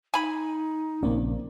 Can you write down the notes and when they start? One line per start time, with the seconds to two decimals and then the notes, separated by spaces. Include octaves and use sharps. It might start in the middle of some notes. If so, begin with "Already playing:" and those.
0.14 D#4 G#5 B5
1.03 A#1 C#3 A#3 C4 C#4 D5